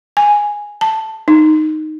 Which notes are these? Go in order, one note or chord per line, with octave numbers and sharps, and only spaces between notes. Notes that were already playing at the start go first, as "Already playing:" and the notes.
G#5
A5
D#4